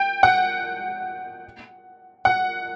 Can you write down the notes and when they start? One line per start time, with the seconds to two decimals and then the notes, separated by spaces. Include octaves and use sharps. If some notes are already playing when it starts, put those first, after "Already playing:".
Already playing: G5
0.23 F#5
2.25 F#5